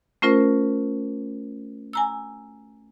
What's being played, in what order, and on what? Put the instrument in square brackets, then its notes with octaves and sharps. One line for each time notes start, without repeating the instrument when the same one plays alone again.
[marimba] A3 C#4 F4 A#4 C5
G#5 A#5 E6